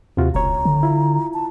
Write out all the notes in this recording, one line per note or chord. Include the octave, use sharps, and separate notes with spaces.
D#2 C3 F4 F#4
E1 C#2 C#5 A#5
D3
E4 F4
A5